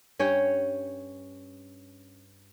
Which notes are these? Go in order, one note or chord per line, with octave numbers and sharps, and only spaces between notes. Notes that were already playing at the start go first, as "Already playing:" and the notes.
G2 C#4 C#5 G5